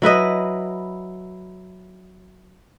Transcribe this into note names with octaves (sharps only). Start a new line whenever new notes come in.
F#3 E4 B4 D#5